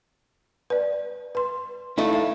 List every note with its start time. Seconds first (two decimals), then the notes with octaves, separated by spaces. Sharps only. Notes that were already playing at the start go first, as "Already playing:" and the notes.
0.70 B4 D5
1.35 B4 C6
1.98 A3 D#4 E4 E5 F5
2.13 E5 F5